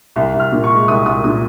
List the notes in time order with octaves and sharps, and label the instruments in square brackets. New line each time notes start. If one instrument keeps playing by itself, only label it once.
[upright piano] C2
C2
F6
A#2
C#6
G#3
C2 D#6
C2 D#6
A#2 D#6